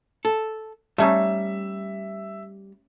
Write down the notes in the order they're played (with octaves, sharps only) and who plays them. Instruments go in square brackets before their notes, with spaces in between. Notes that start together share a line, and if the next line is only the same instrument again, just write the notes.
[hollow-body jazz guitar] A4
[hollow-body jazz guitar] G3 [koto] A3 C#4 D#4 [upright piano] E5